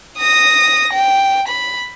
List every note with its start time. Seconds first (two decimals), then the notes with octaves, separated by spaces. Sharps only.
0.19 D#6 A#6
0.93 G5
1.48 B5